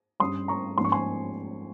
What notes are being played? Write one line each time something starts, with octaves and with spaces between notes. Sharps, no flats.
G2 G3 C#4 C6 D#6
A#5 C#6
G#2 F3 A#3 C#4 C6
C#6
G#5 C6